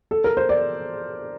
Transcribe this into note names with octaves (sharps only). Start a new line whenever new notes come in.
A4
A#4
C5
D5